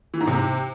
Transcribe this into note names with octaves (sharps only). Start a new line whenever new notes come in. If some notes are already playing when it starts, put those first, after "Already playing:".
E3
G#2
C3